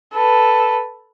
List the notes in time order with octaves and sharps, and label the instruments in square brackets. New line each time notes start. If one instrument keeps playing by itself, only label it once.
[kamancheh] A4 B4